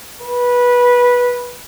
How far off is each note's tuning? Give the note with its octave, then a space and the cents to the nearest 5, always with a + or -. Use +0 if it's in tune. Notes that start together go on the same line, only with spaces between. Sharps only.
B4 -15